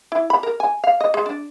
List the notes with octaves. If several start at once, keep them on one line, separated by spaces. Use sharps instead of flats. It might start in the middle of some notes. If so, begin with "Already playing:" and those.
E4
B5
A#4
G#5
F5
D#5
G#3
D4